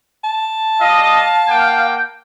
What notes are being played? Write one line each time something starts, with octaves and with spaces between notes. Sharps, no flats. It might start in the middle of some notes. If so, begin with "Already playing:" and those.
A5
G3 D#5 F5
A#3 F#5 G5